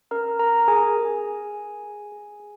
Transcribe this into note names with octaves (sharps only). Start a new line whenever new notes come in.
C#4 A#4 A#5
C#4 A#4 A#5
G#4 G#5
G#4
G#4
G#4
G#4
G#4
G#4